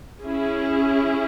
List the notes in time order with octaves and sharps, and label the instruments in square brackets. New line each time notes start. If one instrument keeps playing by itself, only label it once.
[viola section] C#4 E4 G#4